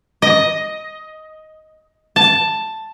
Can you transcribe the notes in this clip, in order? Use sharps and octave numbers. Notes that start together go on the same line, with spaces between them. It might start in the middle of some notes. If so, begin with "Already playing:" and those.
D#5
A5